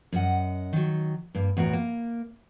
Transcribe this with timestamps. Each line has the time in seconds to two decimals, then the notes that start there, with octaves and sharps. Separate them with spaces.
0.12 F#2 D#5 F#5
0.73 D#3 F#3
1.35 G2 A#3
1.57 E2 A2 F#4 A#4
1.73 A#3